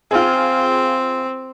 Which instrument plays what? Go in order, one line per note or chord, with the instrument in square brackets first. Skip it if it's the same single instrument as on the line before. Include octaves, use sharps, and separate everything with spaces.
[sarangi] C4 [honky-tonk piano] F4 G#4